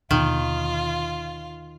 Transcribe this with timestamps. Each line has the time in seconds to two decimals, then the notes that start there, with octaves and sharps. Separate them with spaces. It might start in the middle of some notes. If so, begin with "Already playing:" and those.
0.11 D#2 B2 D3 D#3 F4